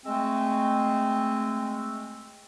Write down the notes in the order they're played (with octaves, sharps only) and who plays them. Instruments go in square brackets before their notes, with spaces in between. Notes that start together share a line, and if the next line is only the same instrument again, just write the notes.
[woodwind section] G#3 A3 C4